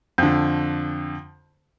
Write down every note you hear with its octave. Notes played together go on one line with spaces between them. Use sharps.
F2 D3